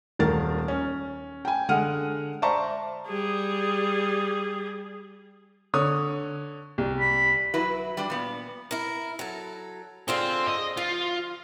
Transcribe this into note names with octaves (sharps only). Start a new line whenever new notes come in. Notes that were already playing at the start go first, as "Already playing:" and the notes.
D#1 D#3 A#4 A6
C#4
G5 G#5
D3 G#3 F#5 F6 D#7
C5 D5 E5 A5 A#5 C#6
G3 G#4
D3 C#5 D#6
C2
B5
F#3 E4 F#4 B4
G3 D4
A#2 B3
E4 A#4
F#3 A4
D3 C4 F4 G#4
D#5
F3 F4